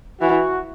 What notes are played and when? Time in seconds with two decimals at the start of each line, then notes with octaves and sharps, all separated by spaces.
0.21 E3 F#4